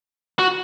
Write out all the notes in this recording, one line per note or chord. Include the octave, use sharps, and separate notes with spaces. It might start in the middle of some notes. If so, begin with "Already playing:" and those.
F#4